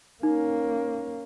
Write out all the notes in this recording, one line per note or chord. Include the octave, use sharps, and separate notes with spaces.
A#3 C#4 D#4